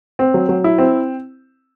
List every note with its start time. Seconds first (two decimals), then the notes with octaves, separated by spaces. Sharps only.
0.19 C4
0.34 F#3
0.49 F#3
0.64 E4
0.78 C4